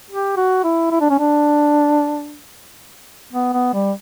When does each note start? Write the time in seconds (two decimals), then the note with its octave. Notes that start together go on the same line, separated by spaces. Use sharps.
0.11 G4
0.37 F#4
0.64 E4
0.91 E4
1.01 D4
1.10 C#4
1.19 D4
3.33 B3
3.53 B3
3.74 G3